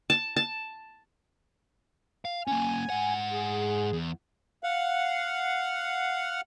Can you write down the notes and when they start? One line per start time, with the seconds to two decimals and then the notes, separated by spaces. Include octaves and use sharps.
0.10 A5
0.36 A5
2.25 F5
2.47 A#3 C#4 G#5
2.90 G#2 F#5
3.32 G#4
3.93 E2
4.63 F5 F#5